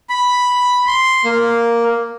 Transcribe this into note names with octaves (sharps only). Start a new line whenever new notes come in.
B5
C6
A#3